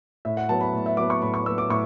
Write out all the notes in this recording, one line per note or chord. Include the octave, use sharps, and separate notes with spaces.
A2 E5
F#5
F#3 B3 A5
B5
A2
E5
F#3 B3 D6
C#6
A2 B5
C#6
F#3 B3 E6
D6
A2 C#6